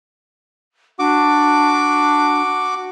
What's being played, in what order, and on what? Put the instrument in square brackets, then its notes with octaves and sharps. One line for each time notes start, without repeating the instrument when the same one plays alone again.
[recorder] D4 [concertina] F#4 D6